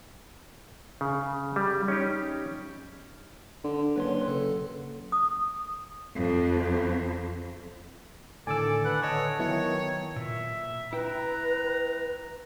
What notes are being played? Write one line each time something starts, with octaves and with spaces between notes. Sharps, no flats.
C#3
G3
C#4 D#4 G4
D3
F#1 B4 C#5 C6
C#3 A4
D#6
F2
A2 D3 D#3 A4 D5 G#5 E6
B4 F#5
D3 C#5 D#5 A5 C#6
D#3 F#3 B3 E4 C#5
A#2 E5
E4 B4 G5 A#5